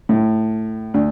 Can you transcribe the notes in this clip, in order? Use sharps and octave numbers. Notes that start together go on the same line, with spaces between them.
A2
D2